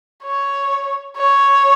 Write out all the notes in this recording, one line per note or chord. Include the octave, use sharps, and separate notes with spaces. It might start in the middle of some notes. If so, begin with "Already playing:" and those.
C#5
C#5